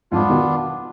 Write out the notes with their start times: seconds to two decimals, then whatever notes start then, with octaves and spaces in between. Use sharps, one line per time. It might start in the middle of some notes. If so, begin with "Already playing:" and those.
0.12 F2 G#2 B3 D4 F4
0.29 B2 D#3